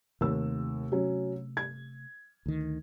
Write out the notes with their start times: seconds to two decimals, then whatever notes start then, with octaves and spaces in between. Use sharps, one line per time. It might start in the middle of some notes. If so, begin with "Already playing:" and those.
0.21 D#2 C3 A3 E6
0.92 F#3 C#4
1.57 G#6
2.46 D2 D#3